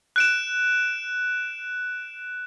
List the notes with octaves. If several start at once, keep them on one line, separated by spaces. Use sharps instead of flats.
F#6 D7 E7